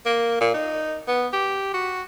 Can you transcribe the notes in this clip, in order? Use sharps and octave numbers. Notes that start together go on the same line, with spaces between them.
A#3
A#2
D#4
B3
G4
F#4